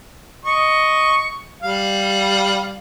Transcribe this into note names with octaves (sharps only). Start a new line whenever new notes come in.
D#5 C#6
G3 F5